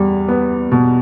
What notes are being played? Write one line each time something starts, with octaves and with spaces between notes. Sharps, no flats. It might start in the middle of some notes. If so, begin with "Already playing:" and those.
Already playing: E2 G3
B3
B2